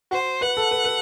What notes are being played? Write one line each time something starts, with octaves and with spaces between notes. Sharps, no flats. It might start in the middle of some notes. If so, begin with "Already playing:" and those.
F#4 C5
B4 F#5
A4
B4
B4